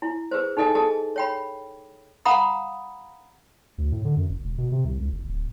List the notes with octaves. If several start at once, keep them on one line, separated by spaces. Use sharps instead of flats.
E4
G#4 B4 C5
D#4 G#4 A4 D#5 G#5
G#4 A4 D#5 A5
C#5 G5 B5
F5 F#5 A#5 B5 D#6
D2
A2
D3
F#2
F#1
E1
B2
C3
C2
C#2
F#1
D1